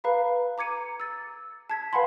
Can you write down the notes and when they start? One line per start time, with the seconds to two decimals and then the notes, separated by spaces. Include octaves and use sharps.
0.04 B4 F5 A#5 B5
0.58 A#5 D6 G#6 C#7 D#7
1.00 E6 A6
1.70 A5 G#6 B6
1.93 B4 F5 F#5 G#5 B5 C6